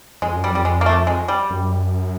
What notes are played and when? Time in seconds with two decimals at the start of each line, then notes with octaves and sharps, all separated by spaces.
0.22 F2 G#3
0.36 F#2
0.44 G3
0.50 F2
0.55 G3
0.65 G#3
0.81 A#3
0.86 A3
1.07 G#3
1.28 G3
1.50 F#2